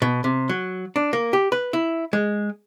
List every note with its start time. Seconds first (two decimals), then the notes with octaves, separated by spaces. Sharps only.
0.02 B2
0.24 C3
0.49 F#3
0.96 D4
1.13 A#3
1.33 G4
1.52 B4
1.73 E4
2.13 G#3